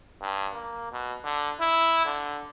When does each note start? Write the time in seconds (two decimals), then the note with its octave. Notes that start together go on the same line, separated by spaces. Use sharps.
0.22 G2
0.53 A#3
0.92 B2
1.24 D3
1.61 E4
2.05 D3